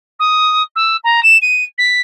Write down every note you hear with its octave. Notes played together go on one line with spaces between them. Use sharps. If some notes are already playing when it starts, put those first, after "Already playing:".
D#6
E6
A#5
E7
D#7
B6